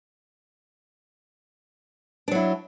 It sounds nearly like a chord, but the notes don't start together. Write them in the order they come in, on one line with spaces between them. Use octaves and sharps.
D4 F#3 E4